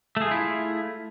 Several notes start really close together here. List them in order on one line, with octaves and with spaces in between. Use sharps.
A3 G#4 F4 E4